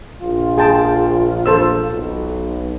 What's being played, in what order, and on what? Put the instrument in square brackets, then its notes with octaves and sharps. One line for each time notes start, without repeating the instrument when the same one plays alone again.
[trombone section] A#1 F4
[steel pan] G#4 G5 A5
A4 C5 E6
[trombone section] B1